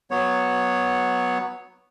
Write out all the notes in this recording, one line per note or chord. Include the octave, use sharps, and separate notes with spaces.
F#3 B3 C#5